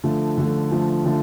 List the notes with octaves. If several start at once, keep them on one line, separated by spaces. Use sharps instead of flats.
D3 F3 A3
D3 F3 A3
D3 F3 A3
D3 F3 A3